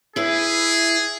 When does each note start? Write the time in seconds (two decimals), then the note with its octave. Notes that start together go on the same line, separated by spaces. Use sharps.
0.16 E4 G#4 B4